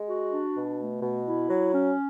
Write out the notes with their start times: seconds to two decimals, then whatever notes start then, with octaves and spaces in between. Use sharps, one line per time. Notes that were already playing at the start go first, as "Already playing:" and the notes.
Already playing: G#3
0.09 F#4
0.32 D4
0.56 B2
0.80 A3
1.02 B2
1.26 E4
1.50 F#3
1.73 C#4